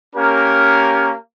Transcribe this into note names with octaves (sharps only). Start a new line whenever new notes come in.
A#3 C#4 G4 A#4